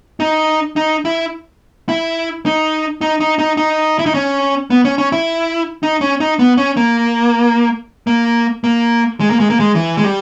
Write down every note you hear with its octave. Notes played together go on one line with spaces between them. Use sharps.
D#4
D#4
E4
E4
D#4
D#4
D#4
D#4
D#4
E4
D#4
C#4
B3
C#4
C#4
E4
D#4
C#4
D#4
B3
C#4
A#3
A#3
A#3
G#3
A#3
G#3
A#3
G#3
E3
G#3
G3